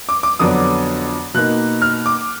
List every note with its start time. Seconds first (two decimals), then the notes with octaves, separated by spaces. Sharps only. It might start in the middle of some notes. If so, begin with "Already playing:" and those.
0.09 D6
0.23 D6
0.39 F2 D3 F#3 B3 D4 D#6
1.34 B2 A#3 D#4 F#6
1.82 F6
2.06 D6